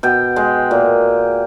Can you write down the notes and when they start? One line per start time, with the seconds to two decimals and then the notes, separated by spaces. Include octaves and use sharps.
0.03 B2 G5
0.36 G#3
0.71 A#2